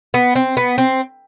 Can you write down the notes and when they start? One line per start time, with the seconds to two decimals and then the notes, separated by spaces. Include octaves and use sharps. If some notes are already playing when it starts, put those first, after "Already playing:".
0.14 B3
0.35 C4
0.57 B3
0.78 C4